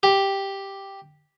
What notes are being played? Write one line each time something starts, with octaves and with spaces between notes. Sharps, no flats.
G4